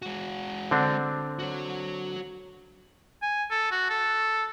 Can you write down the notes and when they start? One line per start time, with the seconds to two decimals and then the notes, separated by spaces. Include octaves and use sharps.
0.02 G#3 F#4
0.71 D3 C4 D4
1.39 F#4 C#5
3.22 G#5
3.50 A4
3.71 F#4
3.90 A4